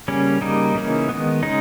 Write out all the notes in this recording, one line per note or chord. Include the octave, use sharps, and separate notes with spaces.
C#3 G3 A#3 C#4
C#3 G3 A#3 D#4
C#3 E3 A#3 C#4
D#3 G#3 B3
C#3 G#3 C#4 D#4